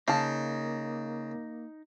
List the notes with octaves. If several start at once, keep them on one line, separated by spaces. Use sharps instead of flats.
C#3 A#3 D#4 F5 A5